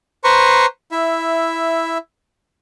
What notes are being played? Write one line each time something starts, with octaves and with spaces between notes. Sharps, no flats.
B4 C5 A#5 C6 C#6
E4 E5